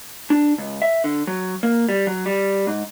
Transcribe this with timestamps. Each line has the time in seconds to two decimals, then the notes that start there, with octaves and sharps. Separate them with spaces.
0.30 D4
0.58 C#2
0.82 E5
1.04 D3
1.27 F#3
1.63 A#3
1.89 G3
2.07 F#3
2.26 G3
2.67 G#2